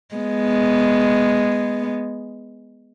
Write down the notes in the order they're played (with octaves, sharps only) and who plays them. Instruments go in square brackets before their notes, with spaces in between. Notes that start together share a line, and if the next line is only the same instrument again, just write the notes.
[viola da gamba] G#3 B3